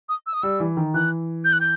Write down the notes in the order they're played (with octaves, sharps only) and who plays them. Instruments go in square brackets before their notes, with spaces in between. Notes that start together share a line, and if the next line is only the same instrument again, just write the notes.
[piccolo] D#6
E6
D#6
[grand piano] G3 [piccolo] E6
[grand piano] E3
D#3
[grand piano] E3 [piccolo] F#6
[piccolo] G6
F#6
G6